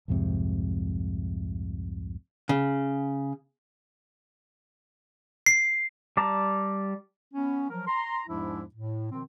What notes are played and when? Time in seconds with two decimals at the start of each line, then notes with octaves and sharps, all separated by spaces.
0.08 C2 F2 G#2 C3
2.49 C#3
5.46 C7
6.17 G3 D5 A5 A#5
7.34 B3 C#4
7.70 F3 F#3 A#4
7.87 A#5 C6
8.27 E2 G#2 F3 G#3 D4 E4
8.74 A2
9.11 B2 D#3 F3 C4